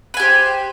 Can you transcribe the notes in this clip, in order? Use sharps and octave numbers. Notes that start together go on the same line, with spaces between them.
G4 B4 C5 G#5